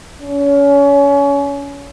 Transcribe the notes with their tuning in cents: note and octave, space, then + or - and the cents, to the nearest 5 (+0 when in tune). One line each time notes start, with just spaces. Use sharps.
C#4 +30